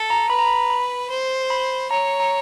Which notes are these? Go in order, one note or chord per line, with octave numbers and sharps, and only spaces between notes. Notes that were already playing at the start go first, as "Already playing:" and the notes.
Already playing: A4
A#5
B4 B5
A#5
B5
B5
C5
B5
C#5 A#5
A#5